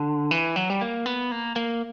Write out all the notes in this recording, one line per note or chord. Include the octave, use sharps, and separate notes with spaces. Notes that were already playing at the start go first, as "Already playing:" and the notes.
Already playing: D3
E3
F#3
G3
A#3
B3
A#3
A#3